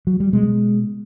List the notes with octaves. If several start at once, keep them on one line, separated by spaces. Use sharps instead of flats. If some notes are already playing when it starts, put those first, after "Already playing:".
F#3
G3
B2 G#3